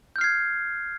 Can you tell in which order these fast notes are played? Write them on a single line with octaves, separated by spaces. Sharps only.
G6 F6 C7 G#6